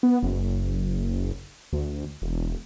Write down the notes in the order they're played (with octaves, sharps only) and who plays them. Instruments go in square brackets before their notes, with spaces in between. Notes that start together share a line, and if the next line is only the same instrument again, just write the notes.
[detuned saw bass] B3
F#1
D2
E1